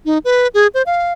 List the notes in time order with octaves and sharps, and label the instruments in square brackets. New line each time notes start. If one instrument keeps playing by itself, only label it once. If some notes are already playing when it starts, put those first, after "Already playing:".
[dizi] D#4
B4
G#4
C5
F5